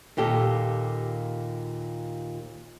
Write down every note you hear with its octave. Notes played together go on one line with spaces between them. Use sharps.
D#2 A#2 G4 A4